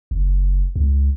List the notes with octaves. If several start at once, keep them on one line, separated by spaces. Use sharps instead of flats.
F#1
C#2